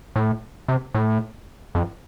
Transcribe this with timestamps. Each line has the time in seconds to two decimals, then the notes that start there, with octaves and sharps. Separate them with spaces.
0.16 A2
0.68 C3
0.95 A2
1.75 F2